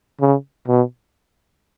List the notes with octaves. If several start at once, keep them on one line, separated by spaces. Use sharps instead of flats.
C#3
B2